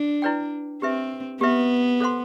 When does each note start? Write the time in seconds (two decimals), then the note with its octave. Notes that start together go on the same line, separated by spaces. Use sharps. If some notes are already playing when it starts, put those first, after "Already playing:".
Already playing: D4
0.22 E4 B4 D5 G5
0.82 C4 G4 B4 E5
1.41 B3 G4 B4 E5
2.00 A4 C5 F#5 C6